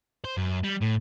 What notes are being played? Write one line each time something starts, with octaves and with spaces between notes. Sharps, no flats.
C5
F#2
G3
A2